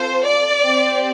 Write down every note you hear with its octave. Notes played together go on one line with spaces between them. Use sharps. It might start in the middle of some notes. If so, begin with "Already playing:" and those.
Already playing: C4 F4 A4 C5
D5
C4 G4